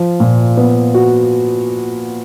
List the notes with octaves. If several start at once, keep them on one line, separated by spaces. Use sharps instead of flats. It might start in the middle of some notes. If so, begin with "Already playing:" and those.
Already playing: F3
A#2
B3
F#4